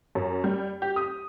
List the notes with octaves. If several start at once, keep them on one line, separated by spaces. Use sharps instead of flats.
F#2
G3
G4
D#6